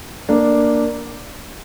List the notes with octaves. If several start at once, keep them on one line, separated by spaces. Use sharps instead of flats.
A#3 D4